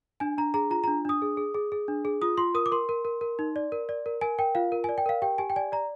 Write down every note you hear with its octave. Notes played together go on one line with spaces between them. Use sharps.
D4 G#5
D4 A#5
G#4 A#5
F4 A#5
D4 A#5
D4 D#6
G#4
G#4
G#4
G#4
D4
G#4
F4 D#6
F4 C6
A#4 D#6
D6
A#4 C6
A#4
A#4
A#4
D#4
D5
A#4
D5
A#4
A#4 G#5
A#4 G5
F4 F5
A#4
D5 G#5
G5
A#4 F5
G4 G5
G4 G#5
G5
D5 G#5
D5 A#5